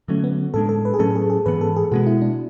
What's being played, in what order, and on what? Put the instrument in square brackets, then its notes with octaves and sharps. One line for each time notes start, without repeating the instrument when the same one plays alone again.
[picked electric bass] D3 F#3 C#4 [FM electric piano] A3
[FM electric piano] B3
[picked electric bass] A2 G#3 D4 [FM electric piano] A4
[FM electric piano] A4
B4
G#4
[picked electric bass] A2 F#3 A3 C#4 [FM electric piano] A4
[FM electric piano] G#4
G#4
[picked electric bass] G#2 E3 B3 [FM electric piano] B4
[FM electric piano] A4
G#4
[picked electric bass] B2 G#3 B3 [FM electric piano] F#4
[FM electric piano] E4
D4